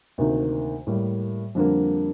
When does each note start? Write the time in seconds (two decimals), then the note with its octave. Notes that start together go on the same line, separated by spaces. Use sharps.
0.18 D2 C3 D#3 A#3 D#4
0.87 A2 G3 A#3
1.55 F2 D3 G3 A#3